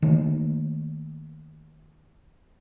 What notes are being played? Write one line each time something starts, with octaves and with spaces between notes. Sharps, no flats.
D#3 A3 A#3